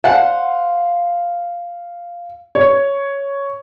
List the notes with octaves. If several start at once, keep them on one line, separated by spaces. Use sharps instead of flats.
C5 F5 F#5
C#5